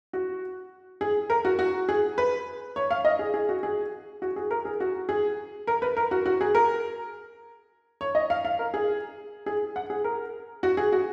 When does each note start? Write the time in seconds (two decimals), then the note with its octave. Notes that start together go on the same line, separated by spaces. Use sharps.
0.13 F#4
1.01 G#4
1.30 A#4
1.45 F#4
1.59 F#4
1.89 G#4
2.18 B4
2.76 C#5
2.91 F5
3.05 D#5
3.19 G#4
3.34 G#4
3.49 F#4
3.63 G#4
4.22 F#4
4.36 G#4
4.51 A#4
4.65 G#4
4.80 F#4
5.09 G#4
5.67 A#4
5.82 B4
5.97 A#4
6.11 F#4
6.26 F#4
6.41 G#4
6.55 A#4
8.01 C#5
8.15 D#5
8.30 F5
8.45 F5
8.59 A#4
8.74 G#4
9.46 G#4
9.76 F#5
9.90 G#4
10.04 A#4
10.63 F#4
10.77 G#4
10.92 F#4